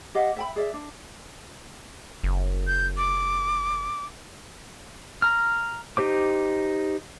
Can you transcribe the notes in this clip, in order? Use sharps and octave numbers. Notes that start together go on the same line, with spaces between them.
G4 D#5 F5 F#5
E5 G5 B5
G#4 D5 E5
D4
F#1
G6
D6
A#5 F6
D#4 G4 C5 D6